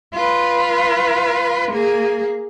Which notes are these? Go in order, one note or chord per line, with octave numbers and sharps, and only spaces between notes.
F4 B4
A#3 G#4